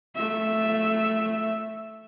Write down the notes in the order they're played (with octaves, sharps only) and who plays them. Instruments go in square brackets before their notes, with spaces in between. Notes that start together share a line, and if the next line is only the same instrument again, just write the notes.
[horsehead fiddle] A3 E5